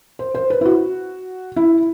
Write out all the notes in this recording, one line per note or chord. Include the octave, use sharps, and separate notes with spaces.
C5
C5
B4
E4
F#4
E4